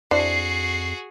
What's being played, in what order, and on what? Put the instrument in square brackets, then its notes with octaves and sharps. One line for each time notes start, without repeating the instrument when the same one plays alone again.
[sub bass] F2 [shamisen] D4 E4 C5 [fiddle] F#4 G#4 [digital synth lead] C7